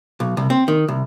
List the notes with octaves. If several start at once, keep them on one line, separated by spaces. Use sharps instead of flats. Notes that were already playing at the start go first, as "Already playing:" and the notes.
B1
C2
C4
D#3
C2